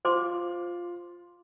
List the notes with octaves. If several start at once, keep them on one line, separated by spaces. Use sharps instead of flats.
F4 C5 C6 D6